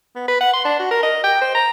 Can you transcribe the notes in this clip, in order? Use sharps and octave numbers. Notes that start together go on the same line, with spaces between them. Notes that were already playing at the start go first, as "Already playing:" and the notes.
B3
B4
F#5
C6
D4
F#4
A#4
D#5
G5
C5
A#5